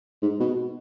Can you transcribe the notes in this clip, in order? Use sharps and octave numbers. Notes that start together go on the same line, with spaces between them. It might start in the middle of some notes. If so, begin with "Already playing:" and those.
G#2
B2